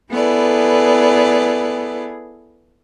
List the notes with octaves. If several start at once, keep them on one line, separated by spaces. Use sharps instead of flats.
B3 E4 G#4 A4 B4 D5